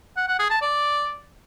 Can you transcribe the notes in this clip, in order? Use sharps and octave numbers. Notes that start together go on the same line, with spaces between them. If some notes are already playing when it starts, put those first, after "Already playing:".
F#5
F#5
G#4
A5
D5